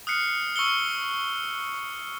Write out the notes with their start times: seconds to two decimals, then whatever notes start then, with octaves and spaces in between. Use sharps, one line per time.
0.07 D#6 F6 F#6 C7 C#7
0.56 C#6 E6 C#7 G7